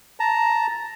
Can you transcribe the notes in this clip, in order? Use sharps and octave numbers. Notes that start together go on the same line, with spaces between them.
A5 A#5